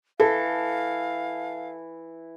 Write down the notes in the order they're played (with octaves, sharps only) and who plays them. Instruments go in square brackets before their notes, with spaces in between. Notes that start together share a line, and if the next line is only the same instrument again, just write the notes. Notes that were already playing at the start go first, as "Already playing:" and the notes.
[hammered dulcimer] E3 [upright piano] A4 [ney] F5